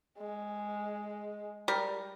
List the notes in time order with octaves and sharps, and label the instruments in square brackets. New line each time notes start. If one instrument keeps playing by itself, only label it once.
[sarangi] G#3
[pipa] G3 A#4